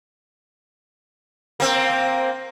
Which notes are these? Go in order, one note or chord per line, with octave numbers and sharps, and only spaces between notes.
A#3 C4